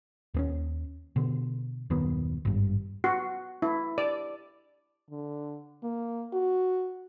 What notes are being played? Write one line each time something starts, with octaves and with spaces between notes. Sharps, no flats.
D#2 B3 C#4
B2 D3
D#1 F#2 D#3 B3
G#1 G2
F#4
E4
D5
D3
A#3
F#4